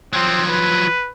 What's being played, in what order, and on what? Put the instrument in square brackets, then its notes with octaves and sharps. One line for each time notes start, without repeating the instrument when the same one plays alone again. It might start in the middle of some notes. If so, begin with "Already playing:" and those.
[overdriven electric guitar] F3 F#3 [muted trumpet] C4
[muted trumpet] B4